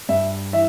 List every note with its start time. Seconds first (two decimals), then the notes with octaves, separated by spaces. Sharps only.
0.09 G2 E5
0.53 E3 E5